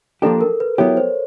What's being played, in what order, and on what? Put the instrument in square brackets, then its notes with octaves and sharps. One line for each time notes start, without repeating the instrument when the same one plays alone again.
[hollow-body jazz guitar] F3 A#3 D4 G4 [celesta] A4
[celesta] A#4
B4
[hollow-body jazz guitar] F#3 B3 E4 G4 [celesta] C#5
[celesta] C5